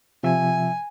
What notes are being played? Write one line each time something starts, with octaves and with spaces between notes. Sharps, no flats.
C3 F3 E5 G#5